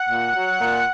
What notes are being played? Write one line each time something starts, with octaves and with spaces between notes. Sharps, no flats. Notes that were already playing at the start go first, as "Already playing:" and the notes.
Already playing: F#5
A#2
F#3
A#2